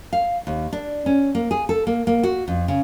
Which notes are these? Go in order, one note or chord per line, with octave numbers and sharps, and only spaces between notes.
F5
D#2
D4
C#4
A#3
G#4
A4
A#3
A#3
F#4
F2
C#3